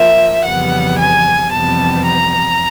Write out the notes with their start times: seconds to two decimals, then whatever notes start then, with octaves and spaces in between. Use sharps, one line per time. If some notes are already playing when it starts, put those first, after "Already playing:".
Already playing: F3 A#3 E5
0.46 F2 C#3 E3 G3 B3 F#5
0.99 G#5
1.52 F2 C3 E3 G3 B3 A5
2.06 A#5